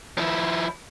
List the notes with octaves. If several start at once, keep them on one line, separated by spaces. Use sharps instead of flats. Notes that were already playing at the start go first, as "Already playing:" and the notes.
F3 E4